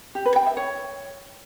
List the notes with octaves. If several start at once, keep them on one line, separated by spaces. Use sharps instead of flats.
G4
B4
G5
E5
C#5